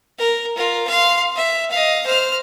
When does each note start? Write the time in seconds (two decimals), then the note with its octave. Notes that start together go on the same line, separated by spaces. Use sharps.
0.18 A#4
0.56 F4 A#4
0.87 F5 C6
1.36 E5
1.71 D#5 F5
2.06 C5 F6